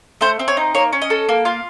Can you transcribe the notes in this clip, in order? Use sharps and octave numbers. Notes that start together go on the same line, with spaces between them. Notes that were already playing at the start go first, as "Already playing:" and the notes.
A3 C5
C4
C#5
D#4
A#3 C#5
C#4
D#5
A4
A#3
F4